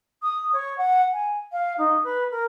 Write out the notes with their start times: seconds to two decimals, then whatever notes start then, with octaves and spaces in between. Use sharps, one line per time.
0.22 D#6
0.53 C#5
0.77 F#5
1.13 G#5
1.52 F5
1.78 D#4
2.03 B4
2.31 A#4